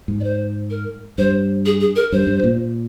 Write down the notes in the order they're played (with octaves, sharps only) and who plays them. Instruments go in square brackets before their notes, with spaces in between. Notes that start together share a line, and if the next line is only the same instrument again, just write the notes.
[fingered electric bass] G#2
[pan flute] D5
C5
A#4
[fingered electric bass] G2 [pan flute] C5
[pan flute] G#4
G#4
A#4
[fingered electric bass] G2 [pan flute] C5
[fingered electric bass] G2
A#2